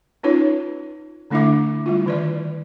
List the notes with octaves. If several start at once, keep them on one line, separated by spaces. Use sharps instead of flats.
C#4 D#4 F4 B4 C#5
D3 A3 D4 E4 E5 D6
G3 E4 F4
D#3 B4 D5